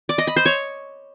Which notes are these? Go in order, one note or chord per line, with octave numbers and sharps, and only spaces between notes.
D5
D#5
B5
C5
C#5